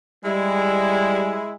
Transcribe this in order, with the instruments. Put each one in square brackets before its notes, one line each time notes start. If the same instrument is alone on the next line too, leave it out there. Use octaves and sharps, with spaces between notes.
[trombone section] G3 [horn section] G#3 E4